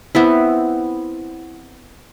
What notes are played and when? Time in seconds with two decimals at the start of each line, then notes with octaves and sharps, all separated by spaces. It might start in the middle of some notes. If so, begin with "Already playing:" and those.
0.15 B3 C4 E4